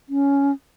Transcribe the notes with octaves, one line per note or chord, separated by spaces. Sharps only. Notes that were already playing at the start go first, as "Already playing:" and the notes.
C#4